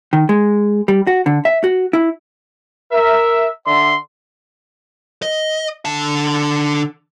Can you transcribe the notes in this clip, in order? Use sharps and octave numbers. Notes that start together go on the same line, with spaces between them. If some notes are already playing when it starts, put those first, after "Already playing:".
D#3
G#3
G3
F#4
D3
E5
F#4
E4
A#4 E5
D3 D5 E5 C6
D#5
D3 A5